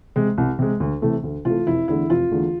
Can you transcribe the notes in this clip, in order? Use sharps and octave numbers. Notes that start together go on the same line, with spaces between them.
C3 G#3
C2
C3 G#3
D2
C3 E3 A3
D2
C3 E3 A3 F4
F1 E4
E2 D3 A3 E4
F1 F4
E2 D3 A3